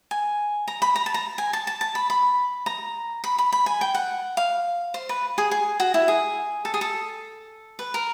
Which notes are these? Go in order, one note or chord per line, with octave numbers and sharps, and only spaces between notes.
G#5
A#5
B5
A#5
A5
A#5
G#5
A5
A5
A5
B5
B5
A#5
B5
B5
B5
G#5
G5
F#5
F5
C5
B4
G#4
G#4
F#4
E4
G#4
A4
G#4
A4
B4
A#4